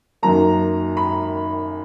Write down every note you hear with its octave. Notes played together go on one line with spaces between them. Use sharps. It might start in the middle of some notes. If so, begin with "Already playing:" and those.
F#2 D#3 F#3 A#3 A#5
B5